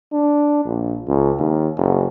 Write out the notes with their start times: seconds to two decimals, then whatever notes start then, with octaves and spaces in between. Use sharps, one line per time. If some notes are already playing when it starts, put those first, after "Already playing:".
0.13 D4
0.65 A#1
1.07 C#2
1.39 D#2
1.77 F#1